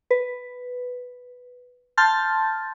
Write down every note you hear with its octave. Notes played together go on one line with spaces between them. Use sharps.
B4
A5 C6 F6 G6 A6